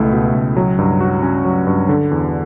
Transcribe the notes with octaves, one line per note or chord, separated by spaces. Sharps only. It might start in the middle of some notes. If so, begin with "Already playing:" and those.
Already playing: C#2 B2 A3 E4
B2
C#2
F#3
G2
F#4
C#4
F#3
G2
D3
E2